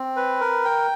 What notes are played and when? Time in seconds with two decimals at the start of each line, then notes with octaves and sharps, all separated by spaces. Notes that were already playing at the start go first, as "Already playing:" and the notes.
Already playing: C4
0.16 B4
0.41 A#4
0.65 G5